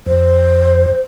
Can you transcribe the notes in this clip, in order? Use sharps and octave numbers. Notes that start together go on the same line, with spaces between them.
F2 C5